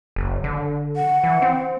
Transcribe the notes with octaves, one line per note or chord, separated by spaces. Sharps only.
F#1
D3
F#5
E3
C4